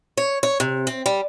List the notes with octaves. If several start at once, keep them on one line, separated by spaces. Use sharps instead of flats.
C#5
C#5
C3
C4
G3